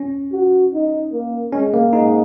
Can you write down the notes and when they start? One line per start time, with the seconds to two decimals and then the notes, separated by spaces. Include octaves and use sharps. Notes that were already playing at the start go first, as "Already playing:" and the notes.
Already playing: C#4
0.32 F#4
0.73 D#4
1.12 A#3
1.52 G#3 C#4
1.74 A#3
1.93 G#2 D#4